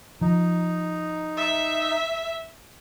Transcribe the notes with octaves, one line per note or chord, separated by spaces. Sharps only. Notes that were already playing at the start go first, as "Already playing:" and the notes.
F3 D#4
E5